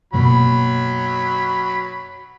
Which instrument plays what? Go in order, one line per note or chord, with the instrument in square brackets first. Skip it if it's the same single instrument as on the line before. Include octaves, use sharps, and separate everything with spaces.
[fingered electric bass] F#2 B2 A#3 [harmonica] F#3 B5